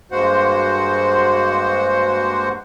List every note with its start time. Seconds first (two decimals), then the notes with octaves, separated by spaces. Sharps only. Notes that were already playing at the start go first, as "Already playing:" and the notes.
0.12 G2 G#3 A#3 F#4 C5 F#5